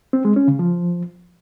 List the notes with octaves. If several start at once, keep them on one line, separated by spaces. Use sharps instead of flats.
C4
G#3
C#4
C#3
F3